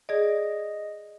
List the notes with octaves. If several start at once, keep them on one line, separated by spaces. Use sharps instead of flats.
G#4 D5 D#5